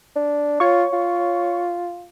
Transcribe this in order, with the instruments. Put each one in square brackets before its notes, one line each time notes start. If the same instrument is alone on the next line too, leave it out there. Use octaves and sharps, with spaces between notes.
[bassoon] D4
[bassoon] F4 [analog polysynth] C#5 C#6
[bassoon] F4